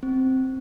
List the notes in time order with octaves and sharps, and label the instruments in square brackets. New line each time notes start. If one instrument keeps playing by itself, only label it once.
[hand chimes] C4